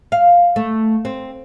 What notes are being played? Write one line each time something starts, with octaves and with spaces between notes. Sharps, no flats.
F5
A3
C4